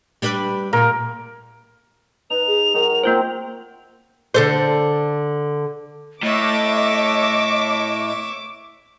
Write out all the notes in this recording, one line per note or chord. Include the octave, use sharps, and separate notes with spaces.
G3 D4 B4
A#2 A#4
D#4 B4 F7
G#4
F#3 D#4 G#4 A#4
A#3 C4 F4 C5
D3 A4 C5
A2 C#5 D#5 E5 D6